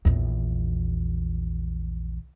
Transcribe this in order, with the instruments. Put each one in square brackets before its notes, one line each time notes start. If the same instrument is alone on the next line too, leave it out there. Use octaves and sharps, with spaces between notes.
[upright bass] A#1 E2